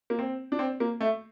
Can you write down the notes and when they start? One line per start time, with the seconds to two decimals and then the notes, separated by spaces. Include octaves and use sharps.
0.10 A#3
0.19 C4
0.52 D4
0.59 C4
0.80 A#3
1.01 A3